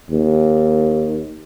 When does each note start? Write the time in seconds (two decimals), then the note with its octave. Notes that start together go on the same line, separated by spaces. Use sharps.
0.11 D#2